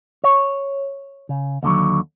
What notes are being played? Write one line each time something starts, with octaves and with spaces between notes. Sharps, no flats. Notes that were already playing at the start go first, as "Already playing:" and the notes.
C#5
C#3
D#2 D3 F3 F#3